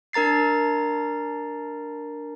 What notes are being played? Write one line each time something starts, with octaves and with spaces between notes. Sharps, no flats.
D4 A#4 A#5 A6 C7